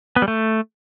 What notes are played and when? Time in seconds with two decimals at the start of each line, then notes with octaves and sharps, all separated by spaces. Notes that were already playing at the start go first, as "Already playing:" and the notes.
0.16 B3
0.22 G3
0.28 A3